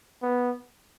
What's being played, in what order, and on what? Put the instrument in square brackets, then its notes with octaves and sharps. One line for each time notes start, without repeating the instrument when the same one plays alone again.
[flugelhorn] B3